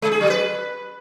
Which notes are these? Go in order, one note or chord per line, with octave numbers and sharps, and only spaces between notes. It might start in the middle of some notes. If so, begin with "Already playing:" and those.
G#3
G#4
F#3
B4